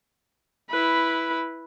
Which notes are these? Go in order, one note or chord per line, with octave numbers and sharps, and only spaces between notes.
E4 B4